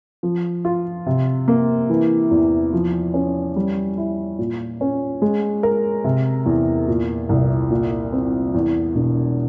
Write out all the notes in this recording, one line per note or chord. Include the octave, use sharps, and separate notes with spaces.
F3
F4
C3
A#3
E3
E2
F3
C#4
G3
E4
A#2
C#4
G#3
A#4
C3
E2
A#2
C2
A#2
C4
E2
E1